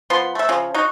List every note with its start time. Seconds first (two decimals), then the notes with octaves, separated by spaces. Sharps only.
0.10 F3 B3 B5 C6
0.35 A3 E5
0.49 C#3 F3
0.74 D#4 F#4